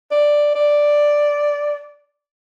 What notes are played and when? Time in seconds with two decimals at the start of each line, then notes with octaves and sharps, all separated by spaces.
0.11 D5
0.55 D5